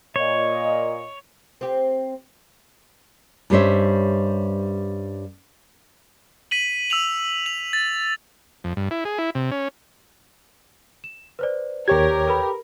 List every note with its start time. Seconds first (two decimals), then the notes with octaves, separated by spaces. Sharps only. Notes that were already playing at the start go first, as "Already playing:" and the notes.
0.16 A#2 C#5 D#5
1.61 C4 G4
3.50 G2 G3 C#4 C5 C#5 E5
6.51 B6 D#7 F#7
6.90 E6 D#7 F7 F#7
7.46 F7
7.73 A6
8.64 F2
8.77 G2
8.91 E4
9.05 G#4
9.18 E4
9.35 C3
9.51 C#4
11.04 E7
11.39 B4 C5 D5
11.88 D#2 G4 A#4 C#5 G#6
12.27 A4 B4 B5